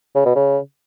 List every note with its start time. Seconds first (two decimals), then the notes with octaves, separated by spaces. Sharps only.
0.15 C#3
0.25 B2
0.36 C#3